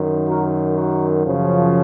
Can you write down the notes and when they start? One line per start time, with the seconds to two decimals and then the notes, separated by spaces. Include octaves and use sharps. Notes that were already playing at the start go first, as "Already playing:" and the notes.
Already playing: F#2 D#3
0.28 F#4 A#4
0.76 F#4 A#4
1.25 F#2 C#3 F3